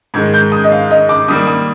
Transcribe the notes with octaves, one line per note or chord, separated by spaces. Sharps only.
G#2 D#3 G#3 G#6
G6
D#6
D#5
F5
D#5
D6
D#3 G3 A#3 D#6
D#6